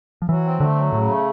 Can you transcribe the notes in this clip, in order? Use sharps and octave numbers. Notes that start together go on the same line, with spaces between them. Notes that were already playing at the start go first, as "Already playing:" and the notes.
F3
E3 F#3
C4
D3 A3
F#3
A2 C#3
A3